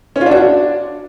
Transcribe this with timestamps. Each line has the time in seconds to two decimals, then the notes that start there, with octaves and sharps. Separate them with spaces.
0.16 C#4
0.21 F4
0.26 D4
0.31 F#4
0.37 D4